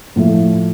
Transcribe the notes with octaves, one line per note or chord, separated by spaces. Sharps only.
A2 F3 A3